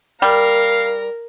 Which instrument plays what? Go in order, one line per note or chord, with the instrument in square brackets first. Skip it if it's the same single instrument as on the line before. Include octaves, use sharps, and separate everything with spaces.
[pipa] G3 [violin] A#4 [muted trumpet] F5